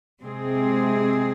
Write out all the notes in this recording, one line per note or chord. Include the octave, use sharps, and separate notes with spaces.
C3 G#3 C4 G#4